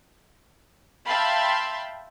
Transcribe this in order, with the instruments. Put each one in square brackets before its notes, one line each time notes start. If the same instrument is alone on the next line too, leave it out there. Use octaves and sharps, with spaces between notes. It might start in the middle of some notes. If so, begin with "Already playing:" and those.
[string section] E5 F5 G5 A5 B5 C6